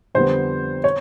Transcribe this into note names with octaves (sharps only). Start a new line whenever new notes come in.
F2 D3 G3 B3 C5
C#5